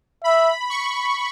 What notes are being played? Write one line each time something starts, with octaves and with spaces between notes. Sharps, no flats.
E5 B5
C#6